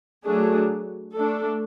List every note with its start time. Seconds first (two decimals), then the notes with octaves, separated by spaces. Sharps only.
0.24 F#3 A3 D4 G#4
1.16 A3 D4 A4